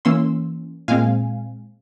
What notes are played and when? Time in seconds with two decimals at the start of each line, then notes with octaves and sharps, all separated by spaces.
0.05 E3 A#3 C#4 C6 E6
0.88 A#2 G#3 C4 F5 G#5